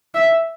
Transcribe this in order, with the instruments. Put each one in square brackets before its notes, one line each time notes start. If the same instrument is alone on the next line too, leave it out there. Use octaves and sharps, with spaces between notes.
[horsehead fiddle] E5